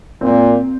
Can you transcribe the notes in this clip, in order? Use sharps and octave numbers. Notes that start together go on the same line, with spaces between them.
A#2 C4